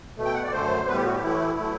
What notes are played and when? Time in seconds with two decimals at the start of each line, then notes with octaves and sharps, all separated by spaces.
0.16 B2 A3
0.25 G5
0.34 F#5
0.43 D5
0.52 F#2 D3 A3 C5
0.87 A2 G3 B3 B4
0.97 G4
1.05 F#4
1.14 G4
1.23 A2 E3 A3 E4
1.59 F#3 A3